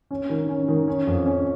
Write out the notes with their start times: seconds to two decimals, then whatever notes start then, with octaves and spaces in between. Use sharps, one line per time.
0.11 C#4
0.29 D#3
0.49 C#4
0.68 D#3
0.88 C#4
1.07 F2
1.26 C#4